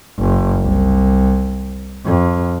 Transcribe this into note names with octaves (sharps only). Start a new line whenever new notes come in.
F#1
C2
F2